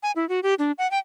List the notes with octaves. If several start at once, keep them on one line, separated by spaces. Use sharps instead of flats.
G#5
E4
F#4
G4
D4
F#5
G5